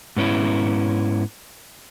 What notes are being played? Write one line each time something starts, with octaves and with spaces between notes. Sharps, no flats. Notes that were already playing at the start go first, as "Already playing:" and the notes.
G#2 B3 C#4 E4